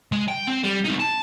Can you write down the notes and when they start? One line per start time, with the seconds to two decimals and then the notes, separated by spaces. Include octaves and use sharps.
0.12 G#3
0.28 G5
0.48 C4
0.64 G3
0.85 C4 D#4
1.00 A5